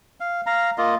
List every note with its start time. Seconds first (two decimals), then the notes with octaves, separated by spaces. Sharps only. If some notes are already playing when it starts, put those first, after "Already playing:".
0.20 F5
0.46 F5 A#5
0.78 A#3 F4 D#5